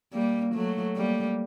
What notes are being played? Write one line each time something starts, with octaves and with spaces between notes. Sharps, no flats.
G3 A#3
F#3 A3
G3 A#3